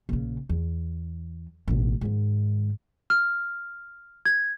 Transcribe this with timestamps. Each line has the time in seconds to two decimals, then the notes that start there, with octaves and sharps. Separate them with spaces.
0.09 A#1 C#3
0.49 E2
1.68 A1 B2
2.01 G#2 D#3
3.10 F6
4.25 G#6